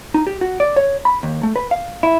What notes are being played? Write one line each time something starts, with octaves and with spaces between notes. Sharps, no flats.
D#4
G4
F#4
D5
C#5
B5
D#2
A3
B4
F5
E4